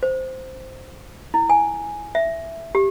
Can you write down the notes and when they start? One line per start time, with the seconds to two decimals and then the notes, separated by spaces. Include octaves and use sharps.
0.03 C5
1.34 E4
1.50 G#5
2.15 E5
2.75 G4